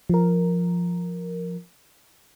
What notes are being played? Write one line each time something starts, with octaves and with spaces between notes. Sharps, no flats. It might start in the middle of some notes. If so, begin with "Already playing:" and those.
F3 A#4